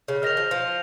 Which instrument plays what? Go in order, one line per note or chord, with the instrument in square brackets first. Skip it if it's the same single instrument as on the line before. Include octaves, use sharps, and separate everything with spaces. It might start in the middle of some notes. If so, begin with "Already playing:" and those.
[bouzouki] C#3
[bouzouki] D#3 [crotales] F6 A#6 F7
[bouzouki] F3
F3